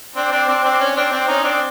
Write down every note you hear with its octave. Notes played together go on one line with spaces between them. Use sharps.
C4 D4
C4 D4
C4 D4
C4 D4
C#4
C4 D4
C4 D4
C#4 D#4
C4 D4